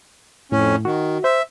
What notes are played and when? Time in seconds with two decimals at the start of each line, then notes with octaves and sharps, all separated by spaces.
0.52 F2 A2 C#4
0.85 D#3 F#4
1.24 C5 E5